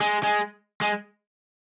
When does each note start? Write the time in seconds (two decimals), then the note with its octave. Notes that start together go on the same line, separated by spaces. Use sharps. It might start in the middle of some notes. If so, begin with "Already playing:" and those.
0.01 G#3
0.23 G#3
0.81 G#3